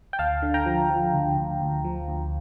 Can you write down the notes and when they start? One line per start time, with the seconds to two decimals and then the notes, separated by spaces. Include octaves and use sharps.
0.13 G5
0.19 D2 F5 A5
0.42 D3
0.54 G5 A#5
0.66 F3
0.90 F3
1.14 D2
1.37 D2
1.61 D2
1.84 F3
2.08 D2